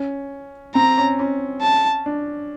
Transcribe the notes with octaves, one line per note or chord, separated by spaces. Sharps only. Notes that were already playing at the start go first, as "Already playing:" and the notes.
Already playing: C#4
C4 A#5
C#4
C#4
A5
D4